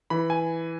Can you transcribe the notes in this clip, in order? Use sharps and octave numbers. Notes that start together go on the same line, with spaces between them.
E3 B5
G#5